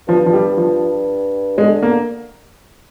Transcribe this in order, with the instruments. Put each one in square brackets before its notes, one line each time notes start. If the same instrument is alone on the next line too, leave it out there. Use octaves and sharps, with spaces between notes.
[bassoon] G2 [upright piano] F3
[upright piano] F3
G3
F3
[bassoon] D3 [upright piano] G#3
[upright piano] A#3